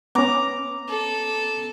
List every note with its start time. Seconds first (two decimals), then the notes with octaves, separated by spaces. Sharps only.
0.15 B3 C#4 A#5 D6
0.89 A4